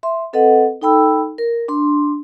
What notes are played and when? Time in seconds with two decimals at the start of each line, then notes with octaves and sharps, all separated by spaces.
0.03 E5 C6
0.33 C4 A4 B4 D#5 F#5
0.82 D#4 A4 G5 B5 E6
1.38 A#4
1.68 D4 C6